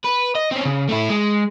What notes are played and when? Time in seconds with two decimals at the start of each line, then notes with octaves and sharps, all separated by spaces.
0.05 B4
0.35 D#5
0.51 C4 C#4
0.65 C#3
0.89 A3 E4
1.10 G#3